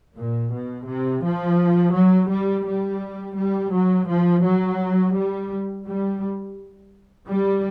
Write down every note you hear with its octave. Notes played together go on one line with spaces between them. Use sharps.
A#2
B2
C3
F3
F#3
G3
G3
G3
F#3
F3
F#3
G3
G3
G3